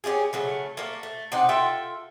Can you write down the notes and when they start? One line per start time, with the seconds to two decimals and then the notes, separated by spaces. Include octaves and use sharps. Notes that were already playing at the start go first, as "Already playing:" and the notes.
0.04 C#4 F4 G4 G#4
0.33 C#3 F#3 A3
0.77 A3 A#3
1.03 A3
1.32 C3 D#4 F#5
1.49 F4 A4 E5 G5